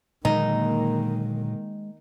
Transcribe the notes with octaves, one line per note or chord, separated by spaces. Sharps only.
A#2 D3 D#3 F#3 G#3 A#3 D#4